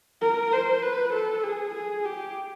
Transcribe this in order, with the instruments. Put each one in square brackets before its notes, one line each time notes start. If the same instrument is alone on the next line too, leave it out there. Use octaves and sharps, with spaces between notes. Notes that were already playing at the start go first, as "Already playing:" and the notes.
[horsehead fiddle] A#4
C5
B4
A4
G#4
G#4
G4